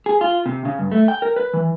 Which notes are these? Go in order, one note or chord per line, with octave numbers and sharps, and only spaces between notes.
G#4
F4
C3
C#3
G2
A3
G5
A#4
B4
E3